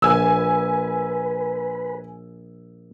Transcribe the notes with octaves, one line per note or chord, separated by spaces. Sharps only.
A#1 B4 G#5 E6